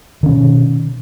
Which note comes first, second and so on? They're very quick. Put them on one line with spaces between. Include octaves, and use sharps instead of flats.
D#3 C#4 B2